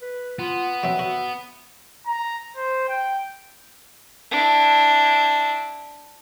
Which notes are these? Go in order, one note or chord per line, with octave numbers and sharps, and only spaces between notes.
B4
B3 F4
F#3 C4 E5
F#4
A#5
C5
G5
D4 E4